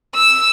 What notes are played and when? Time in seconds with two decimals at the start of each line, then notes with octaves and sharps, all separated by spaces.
0.14 E6